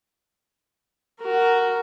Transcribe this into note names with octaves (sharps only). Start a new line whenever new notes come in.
F#4 A#4